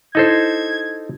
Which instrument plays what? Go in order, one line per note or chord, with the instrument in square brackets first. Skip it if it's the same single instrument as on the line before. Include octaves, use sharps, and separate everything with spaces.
[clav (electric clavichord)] D#4 A4 C5 [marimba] E4 [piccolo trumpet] G#6